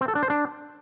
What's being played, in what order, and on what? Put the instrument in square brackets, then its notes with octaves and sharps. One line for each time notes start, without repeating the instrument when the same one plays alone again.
[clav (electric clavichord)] C4
A4
D4
C5
D4